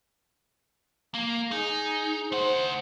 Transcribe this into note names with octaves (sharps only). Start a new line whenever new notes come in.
A#3
D#4 G#4
A3 C5 F#5